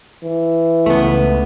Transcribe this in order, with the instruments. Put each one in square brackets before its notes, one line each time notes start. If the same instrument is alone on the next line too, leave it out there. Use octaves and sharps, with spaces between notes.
[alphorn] E3
[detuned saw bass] C#2 [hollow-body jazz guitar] A3 B3